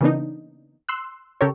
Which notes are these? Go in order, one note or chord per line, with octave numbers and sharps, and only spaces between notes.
C#3 E3 A#3 B3 D4 D#4
C6 E6 F#6
C#3 G4 A4 A#4 C#5